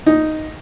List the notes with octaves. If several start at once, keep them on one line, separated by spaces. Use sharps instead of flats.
D#4